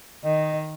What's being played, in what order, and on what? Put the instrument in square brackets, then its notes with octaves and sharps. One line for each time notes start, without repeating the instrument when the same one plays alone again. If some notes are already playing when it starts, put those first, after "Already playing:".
[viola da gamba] D#3 [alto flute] D#5